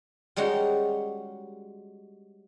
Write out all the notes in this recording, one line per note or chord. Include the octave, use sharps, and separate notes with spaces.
G3 G#3 C#4 D#4 F#4